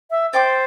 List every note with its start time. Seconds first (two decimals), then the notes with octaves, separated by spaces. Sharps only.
0.11 E5
0.33 C5 D5 G5 D6